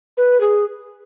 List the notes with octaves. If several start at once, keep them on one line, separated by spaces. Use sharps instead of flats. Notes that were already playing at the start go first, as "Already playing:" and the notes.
B4
G#4